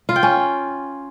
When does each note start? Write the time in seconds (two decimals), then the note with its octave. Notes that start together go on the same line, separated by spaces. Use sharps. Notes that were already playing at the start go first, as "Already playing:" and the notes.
0.09 F4
0.16 G5
0.23 C#4